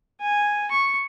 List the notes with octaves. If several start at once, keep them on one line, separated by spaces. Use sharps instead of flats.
G#5
C#6